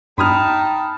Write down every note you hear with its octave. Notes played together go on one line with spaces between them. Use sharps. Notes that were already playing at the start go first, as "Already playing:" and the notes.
G2 D#4 G5 A5 B5 D#6 F6